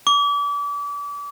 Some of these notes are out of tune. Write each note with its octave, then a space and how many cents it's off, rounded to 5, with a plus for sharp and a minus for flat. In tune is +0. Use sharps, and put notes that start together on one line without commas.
D6 -35